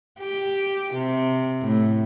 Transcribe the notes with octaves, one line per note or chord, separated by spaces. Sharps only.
G4
C3
A2